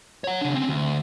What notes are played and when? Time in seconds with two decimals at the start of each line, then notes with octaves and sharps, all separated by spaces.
0.24 C#5 F#5
0.41 C#3 D4
0.54 C4 C#4
0.68 D2